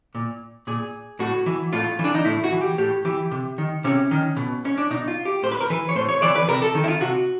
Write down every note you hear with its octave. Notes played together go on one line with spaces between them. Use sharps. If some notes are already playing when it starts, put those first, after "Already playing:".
A#2
A#2 G#4
A2 F#4
E3
A2 F4
E3
D4
D#4
A2 E4
F#4
E3
G4
A2 G4
E3 G4
C3
D#3
C3 C#4
D#3
B2
C#4
D4
B2 D#4
F4
G4
A2 C5
B4
A#4
E3 B4
C#5
A2 C5
C#5
E3 D5
B4
C3 A#4
A4
D#3
E4
F4
C3 F#4